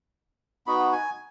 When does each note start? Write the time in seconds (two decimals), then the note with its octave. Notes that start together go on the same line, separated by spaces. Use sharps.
0.67 B3 D#4 F#4 B5
0.92 G#5